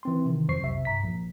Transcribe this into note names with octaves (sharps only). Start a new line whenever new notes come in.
E3 C4 C6
C3 D#3
F2 F#3 C5 C#6 C7
B1 C3 E5
G2 A#5 B6
A#1